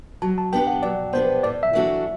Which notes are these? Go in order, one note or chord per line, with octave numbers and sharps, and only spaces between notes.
F#3 A5
A5
B3 D4 G4 B4 G5
F#5
F#3 D5
B3 D4 G4 B4 C5
A2 D5
E5
E3 A3 D4 F#4